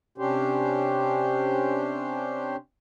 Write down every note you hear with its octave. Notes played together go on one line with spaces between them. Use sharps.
C3 C#4 D4 G4 C5